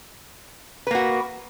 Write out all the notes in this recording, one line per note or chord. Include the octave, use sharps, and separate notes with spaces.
A#3 F#4 B4